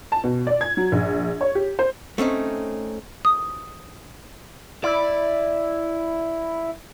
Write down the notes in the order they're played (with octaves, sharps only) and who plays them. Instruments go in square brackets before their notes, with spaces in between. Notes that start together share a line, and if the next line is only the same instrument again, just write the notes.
[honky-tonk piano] A5
B2
D5
G#6
F#3
A#1
C#5
G4
C5
[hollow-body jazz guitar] A3 C4 C#4 D#4
[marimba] D#6
[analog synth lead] E4 [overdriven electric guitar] D5